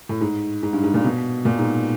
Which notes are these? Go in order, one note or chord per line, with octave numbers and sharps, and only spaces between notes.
A2
G#2
G#2
G2
G#2
A#2
B2
A#2
G#2